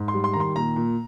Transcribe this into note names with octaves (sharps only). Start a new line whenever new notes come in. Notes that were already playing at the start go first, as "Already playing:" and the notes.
Already playing: G#2
C6
G3
C6
D#3 A#5
C6
A#2 A#5
A#2